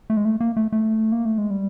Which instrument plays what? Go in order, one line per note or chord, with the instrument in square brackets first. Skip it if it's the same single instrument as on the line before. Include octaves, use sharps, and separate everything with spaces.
[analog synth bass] A3
G#3
A3
A#3
A3
A3
A#3
A3
G#3
G3